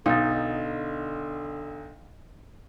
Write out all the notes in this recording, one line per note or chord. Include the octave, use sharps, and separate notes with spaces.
B1 D3 D#4 F5 A6